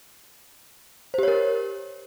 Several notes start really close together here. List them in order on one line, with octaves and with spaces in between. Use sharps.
C5 G4 C#5 A#4